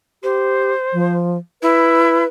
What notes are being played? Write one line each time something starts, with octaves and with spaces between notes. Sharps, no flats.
G4 C5
F3
E4 B4